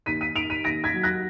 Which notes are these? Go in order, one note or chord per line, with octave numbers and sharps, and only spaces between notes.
D#2 B6 D#7
B6 D#7
D#3 D7 F7
B6 D#7
D#2 A#6 D7
G#6 B6
F#3
F#6 A#6